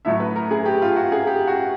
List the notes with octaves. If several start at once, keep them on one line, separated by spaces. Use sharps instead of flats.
A2 F#3 A3 E5
B4
A#4
G#4
G4
F4
F#4
G#4
G4
F#4